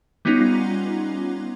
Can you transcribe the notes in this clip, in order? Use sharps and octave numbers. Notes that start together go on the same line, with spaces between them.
G3 B3 C#4 D#4 F4